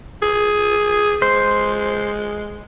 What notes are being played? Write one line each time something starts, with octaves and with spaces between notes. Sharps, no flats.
G#4
G#3 C5